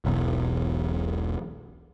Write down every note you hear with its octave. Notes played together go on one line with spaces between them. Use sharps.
E1 B1 E2